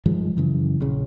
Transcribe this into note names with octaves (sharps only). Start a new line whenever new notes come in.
G2 D#3 F3 G#3
F#2 C#3 E3
A#1 C#3